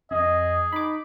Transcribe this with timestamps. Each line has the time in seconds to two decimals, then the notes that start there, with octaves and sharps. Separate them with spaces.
0.11 F2 G#4 D#5
0.73 D#4 B5 D6